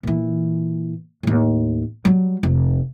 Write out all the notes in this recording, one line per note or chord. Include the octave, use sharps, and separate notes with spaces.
A#2 E3
D#2 A2
F#3 G3
F1